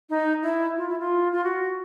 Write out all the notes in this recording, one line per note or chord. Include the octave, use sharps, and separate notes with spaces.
D#4
E4
F4
E4
F4
F4
F#4